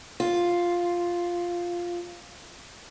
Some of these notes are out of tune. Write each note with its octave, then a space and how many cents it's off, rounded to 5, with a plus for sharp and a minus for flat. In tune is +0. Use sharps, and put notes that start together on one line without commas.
F4 +0